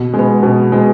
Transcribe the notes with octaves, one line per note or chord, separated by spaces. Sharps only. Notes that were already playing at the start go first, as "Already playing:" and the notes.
Already playing: B2
G#3
B3
B2
G#3 B3